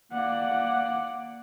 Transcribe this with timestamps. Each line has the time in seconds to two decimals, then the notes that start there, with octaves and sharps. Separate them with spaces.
0.12 A#3 D5 F#5